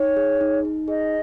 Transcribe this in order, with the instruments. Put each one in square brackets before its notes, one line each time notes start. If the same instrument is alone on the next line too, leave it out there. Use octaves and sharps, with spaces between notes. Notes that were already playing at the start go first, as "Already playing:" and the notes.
Already playing: [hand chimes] D#4 [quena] C#5
[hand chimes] G#4
D#4
D#4
[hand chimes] G#4 [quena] D#5